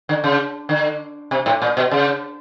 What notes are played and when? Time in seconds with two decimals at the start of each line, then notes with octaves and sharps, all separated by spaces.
0.09 D3
0.24 C#3
0.69 D3
1.31 C3
1.46 A2
1.62 A#2
1.77 B2
1.91 C#3